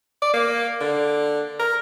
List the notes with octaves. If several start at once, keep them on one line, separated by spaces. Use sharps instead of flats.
D5
A#3
D3
A#4